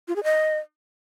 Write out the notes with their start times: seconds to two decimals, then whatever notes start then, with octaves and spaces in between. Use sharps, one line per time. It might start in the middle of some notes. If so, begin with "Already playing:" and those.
0.08 F4
0.16 G#4
0.24 D#5